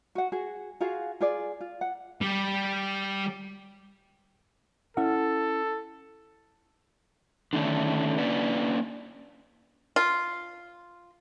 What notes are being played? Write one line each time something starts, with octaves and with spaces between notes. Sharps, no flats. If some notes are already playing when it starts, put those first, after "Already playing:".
F#4 F#5
F#4 G#4
F4 F#4 G#4 F5
F4 G#4 D5
F4
F#5
G3
C#4 E4 A4 F#5
D3 D#3 A3 C#4 D4
A#3 C#4 D4 B4 D5
F4